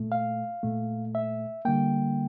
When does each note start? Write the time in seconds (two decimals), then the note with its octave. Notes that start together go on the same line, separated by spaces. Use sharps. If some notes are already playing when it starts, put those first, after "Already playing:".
Already playing: A#2 A3
0.12 F5
0.63 A#2 A3
1.15 E5
1.65 D3 G3 A#3 G5